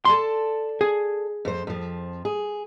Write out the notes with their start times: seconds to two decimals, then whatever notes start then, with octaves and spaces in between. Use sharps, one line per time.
0.05 A4 D5 A5 C6
0.81 G#4
1.45 F2 C5
1.67 F2 F3
2.25 G#4